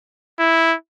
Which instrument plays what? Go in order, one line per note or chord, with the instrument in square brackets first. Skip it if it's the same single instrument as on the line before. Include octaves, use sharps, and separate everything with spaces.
[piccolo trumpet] E4